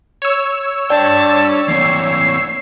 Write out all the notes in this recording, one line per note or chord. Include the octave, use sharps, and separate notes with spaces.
C#5 E6
D4 D5 G5 A5
E3 A#3 C4 C7